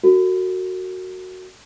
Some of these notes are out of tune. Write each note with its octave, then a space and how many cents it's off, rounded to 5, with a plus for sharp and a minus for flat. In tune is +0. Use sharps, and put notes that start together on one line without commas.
F#4 +0 A#4 -45